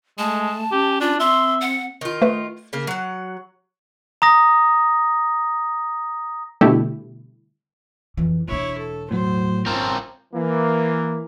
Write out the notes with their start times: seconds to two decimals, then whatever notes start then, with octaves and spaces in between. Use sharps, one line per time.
0.19 G#3 A3 A5
0.72 C#4 G4
1.01 D4 F4
1.20 C4 E5 C6
1.61 F#5
2.01 D#3 F4
2.22 A3 B4
2.73 C#3 A#3
2.87 F#3 F#5
4.22 A#5 D#6 A#6
6.61 B2 D3 G3 A3 E4 G4
8.17 F2 E3
8.48 E1 D4 E4 C#5
8.78 A4
9.11 A2 F#3 C5
9.66 G#1 C4 C#4 F4 A#4 A5
10.34 E3 A#3